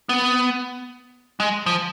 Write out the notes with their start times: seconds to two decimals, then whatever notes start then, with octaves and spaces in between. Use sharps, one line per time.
0.09 B3
1.40 G#3
1.66 F3